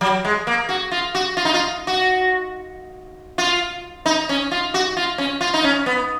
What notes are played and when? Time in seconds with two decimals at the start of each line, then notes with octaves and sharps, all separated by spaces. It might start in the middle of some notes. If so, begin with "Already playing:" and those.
0.01 F#3
0.25 G#3
0.47 A#3
0.69 F#4
0.91 F4
1.15 F#4
1.37 F4
1.45 D#4
1.54 F4
1.87 F#4
3.38 F4
4.06 D#4
4.29 C#4
4.51 F4
4.74 F#4
4.97 F4
5.18 C#4
5.41 F4
5.54 D#4
5.64 C#4
5.86 B3